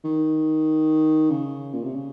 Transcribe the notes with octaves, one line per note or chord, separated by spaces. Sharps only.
D#3
C#3
A#2
C3
C#3